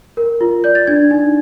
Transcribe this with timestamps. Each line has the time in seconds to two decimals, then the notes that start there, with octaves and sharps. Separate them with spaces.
0.17 A#4
0.41 F4
0.64 D5 G6
0.75 A6
0.87 D4 G#6
1.11 D#4